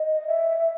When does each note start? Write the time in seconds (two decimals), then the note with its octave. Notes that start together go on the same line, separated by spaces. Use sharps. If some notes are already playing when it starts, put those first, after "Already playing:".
Already playing: D#5
0.27 E5